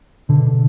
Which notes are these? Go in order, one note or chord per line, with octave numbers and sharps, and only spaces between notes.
B2 D3